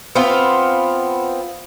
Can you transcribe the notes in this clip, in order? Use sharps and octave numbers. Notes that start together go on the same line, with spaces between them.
B3 C4 F4